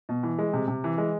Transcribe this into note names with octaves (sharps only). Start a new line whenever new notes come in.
B2
E3
G#3
C3
C3
E3
G#3